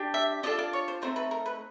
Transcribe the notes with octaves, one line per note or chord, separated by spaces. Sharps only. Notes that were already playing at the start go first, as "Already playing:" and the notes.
Already playing: D4 G4
E5
D4 F4 A4 D#5
D5
C#5
C5
A3 C4 D#4 C5
B4
A#4
B4